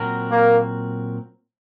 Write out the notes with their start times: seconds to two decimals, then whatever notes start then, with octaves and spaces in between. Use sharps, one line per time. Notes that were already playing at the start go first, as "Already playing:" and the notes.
Already playing: A#2 F#3 C4 F#4 A#4
0.30 A#3